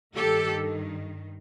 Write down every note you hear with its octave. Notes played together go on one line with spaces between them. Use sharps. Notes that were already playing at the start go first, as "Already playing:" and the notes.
G2 D#3 G4 A4